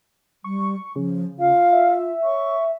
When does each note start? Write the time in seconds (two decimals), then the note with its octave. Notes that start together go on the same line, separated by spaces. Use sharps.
0.44 G3 C#6
0.96 C#3 F3
1.39 F4 F5
1.73 E5
2.23 C#5 C#6